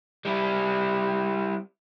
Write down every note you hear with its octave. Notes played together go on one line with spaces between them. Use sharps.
G3 E4